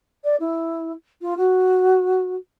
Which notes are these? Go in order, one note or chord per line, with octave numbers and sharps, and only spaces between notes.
D5
E4
F4
F#4